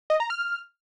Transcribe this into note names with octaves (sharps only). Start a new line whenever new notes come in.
D#5
A#5
F6